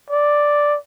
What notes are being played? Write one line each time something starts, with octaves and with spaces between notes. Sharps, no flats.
D5